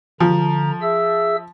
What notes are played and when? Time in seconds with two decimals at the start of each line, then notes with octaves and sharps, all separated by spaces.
0.20 D3 F3 A#5
0.82 G#4 E5 E6